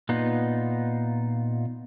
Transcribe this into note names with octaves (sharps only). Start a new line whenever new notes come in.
A#2 B3 D#4 F4